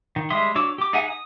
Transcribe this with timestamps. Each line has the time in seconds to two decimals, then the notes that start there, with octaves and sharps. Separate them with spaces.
0.16 D#3
0.30 G3 G#3 E5 C6 D#6
0.55 D4 F#4 C#5 D6 E6
0.78 G4 D6
0.93 D#4 G#4 E5 F#5 G#5
1.10 D#6